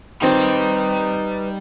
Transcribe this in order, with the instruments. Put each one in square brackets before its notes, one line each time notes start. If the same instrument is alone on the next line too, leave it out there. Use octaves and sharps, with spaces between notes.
[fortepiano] D#3 C4 [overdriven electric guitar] G3 D5 [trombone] D#4 [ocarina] B4